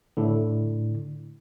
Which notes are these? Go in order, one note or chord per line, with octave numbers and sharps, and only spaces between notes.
A2 D3